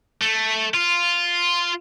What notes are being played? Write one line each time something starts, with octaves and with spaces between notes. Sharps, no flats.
A3
F4